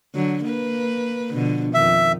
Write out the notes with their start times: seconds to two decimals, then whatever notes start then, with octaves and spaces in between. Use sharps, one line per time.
0.14 D3 F#3
0.44 A#3 B4
1.32 B2 D3 F3
1.74 F2 D#3 E5